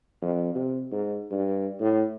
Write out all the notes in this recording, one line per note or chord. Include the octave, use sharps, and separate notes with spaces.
F2
C3
G#2
G2
A2